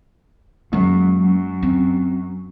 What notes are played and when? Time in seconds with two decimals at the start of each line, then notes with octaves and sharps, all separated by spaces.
0.73 F#2 G#3 A#3
1.19 F#2
1.63 C4